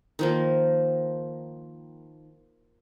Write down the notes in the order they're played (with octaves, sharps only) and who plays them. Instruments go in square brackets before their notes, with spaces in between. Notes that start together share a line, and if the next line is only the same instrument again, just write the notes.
[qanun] D#3 F3 A#3